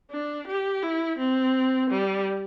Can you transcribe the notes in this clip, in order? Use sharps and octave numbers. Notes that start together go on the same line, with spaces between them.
D4
G4
E4
C4
G3